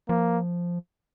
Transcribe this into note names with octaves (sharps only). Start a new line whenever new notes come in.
F3 A#3